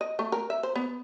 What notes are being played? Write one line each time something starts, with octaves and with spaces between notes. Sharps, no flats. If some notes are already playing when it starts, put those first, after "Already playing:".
D#5
A3
A#4
E5
C5
B3